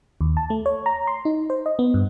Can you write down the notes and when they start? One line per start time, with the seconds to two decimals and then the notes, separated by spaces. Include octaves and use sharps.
0.21 D#2
0.37 A5
0.50 A3
0.66 C#5
0.86 A#5
1.07 C6
1.25 D#4
1.50 C5
1.66 D#5
1.79 B3
1.94 G2